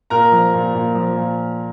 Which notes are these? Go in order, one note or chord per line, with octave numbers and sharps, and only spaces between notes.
A#2 A#4 A#5
F3
A#2
A#2
F3
A#2